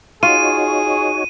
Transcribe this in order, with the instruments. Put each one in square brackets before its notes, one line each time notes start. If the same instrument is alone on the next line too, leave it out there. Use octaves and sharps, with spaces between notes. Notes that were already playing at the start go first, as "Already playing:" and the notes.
[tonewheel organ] D#4 F#4 C#5 [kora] F4 [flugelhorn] G#4 [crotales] D#7